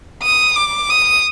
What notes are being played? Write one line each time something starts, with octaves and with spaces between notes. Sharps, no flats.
D#6
D6
D#6